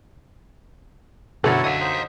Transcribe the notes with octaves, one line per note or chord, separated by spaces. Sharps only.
F#2 B2 D3 E4 A4 C#5
D#5 F5
D#4 C5